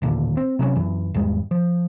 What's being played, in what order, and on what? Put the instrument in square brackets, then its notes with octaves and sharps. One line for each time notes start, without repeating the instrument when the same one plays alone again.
[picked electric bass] A1 D#2 A#2 D3
C4
C3 F#3 G3 C#4
F#2 E3
G#1 E2 G3 G#3
F3